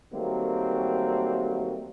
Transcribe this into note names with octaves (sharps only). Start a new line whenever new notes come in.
D#3 F#3 G3 A3 A#3 C4